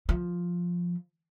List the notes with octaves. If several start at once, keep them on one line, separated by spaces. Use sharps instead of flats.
F3